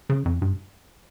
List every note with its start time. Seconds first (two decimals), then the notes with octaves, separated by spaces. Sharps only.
0.09 C#3
0.25 F2
0.42 G2